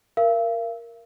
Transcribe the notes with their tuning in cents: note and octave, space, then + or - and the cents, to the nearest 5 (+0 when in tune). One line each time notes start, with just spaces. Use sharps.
A#4 +0 F5 -40